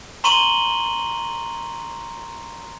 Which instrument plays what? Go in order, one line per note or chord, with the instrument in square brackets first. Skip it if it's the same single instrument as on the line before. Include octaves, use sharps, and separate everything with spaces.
[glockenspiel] A#5 C6 C#6 D#7 F#7 G7